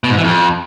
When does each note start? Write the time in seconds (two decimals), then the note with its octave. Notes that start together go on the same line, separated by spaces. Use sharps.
0.04 B2
0.10 G#2
0.17 E3
0.24 F2